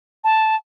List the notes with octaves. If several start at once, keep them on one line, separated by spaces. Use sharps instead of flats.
A5